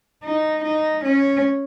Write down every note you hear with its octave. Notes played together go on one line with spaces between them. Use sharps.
D#4
D#4
C#4